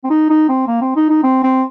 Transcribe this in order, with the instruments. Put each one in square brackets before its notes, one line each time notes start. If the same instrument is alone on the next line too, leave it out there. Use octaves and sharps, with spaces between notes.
[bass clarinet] C4
D#4
D#4
C4
A#3
C4
D#4
D#4
C4
C4